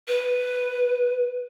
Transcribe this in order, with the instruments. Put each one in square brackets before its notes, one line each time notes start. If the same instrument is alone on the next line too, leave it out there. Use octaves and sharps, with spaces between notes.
[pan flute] B4